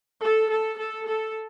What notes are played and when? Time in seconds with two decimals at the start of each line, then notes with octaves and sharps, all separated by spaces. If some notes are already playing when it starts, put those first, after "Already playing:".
0.22 A4
0.50 A4
0.79 A4
1.07 A4